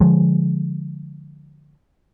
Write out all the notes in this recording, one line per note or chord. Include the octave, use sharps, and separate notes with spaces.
D3 F3 G#3